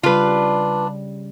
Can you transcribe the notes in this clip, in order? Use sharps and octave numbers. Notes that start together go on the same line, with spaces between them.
C#3 G3 D4 F4 B4